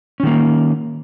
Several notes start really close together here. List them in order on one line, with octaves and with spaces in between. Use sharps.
C#4 D#3 A#3